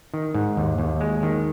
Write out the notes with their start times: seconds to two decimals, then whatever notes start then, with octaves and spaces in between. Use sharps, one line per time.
0.14 D#3
0.34 G#2
0.57 D#2
0.79 D#2
1.00 G#3
1.23 D#3